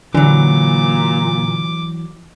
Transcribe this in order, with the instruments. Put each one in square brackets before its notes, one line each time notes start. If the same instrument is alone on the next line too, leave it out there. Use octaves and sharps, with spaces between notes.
[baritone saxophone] A#2 [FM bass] D3 [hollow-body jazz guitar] E3 F#3 [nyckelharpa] D6